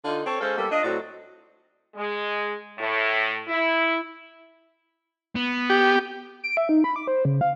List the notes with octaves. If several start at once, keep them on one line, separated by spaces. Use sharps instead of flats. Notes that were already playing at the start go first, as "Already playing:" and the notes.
D3 D#4 F4
C4 A4 C#5
G#3 C#4 A4 C5 F5
G3 A#3 B3 A4
D4 F4 D#5
A2 F#3 C4 F#4 D5
G#3
A2
E4
B3
G4
D7
E5
D#4
B5
D6
C5
C#3
F5